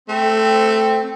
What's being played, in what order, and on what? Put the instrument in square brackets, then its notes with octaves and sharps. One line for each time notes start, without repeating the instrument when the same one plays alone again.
[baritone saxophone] A3 [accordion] C4